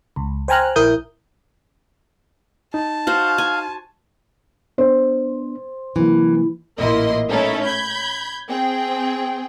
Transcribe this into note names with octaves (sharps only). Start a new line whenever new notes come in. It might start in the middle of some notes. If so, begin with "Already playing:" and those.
C#2
C5 G5 G#5 A#5 F6 F#6
A#1 E4 A#4 D#6 G6
D#4 A5
F#4 C5 F5
G#5
B3 D4 C5
C3 E3 F#3 A#3
A1 A#2 A#3 E4 D#5 C6
A3 C#4 D#4 E4 A4
B5 G6 G#6
C4 G#4 G5